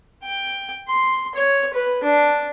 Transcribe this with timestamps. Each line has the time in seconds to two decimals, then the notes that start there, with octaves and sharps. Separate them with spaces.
0.24 G5
0.89 C6
1.35 C#5
1.73 B4
2.04 D4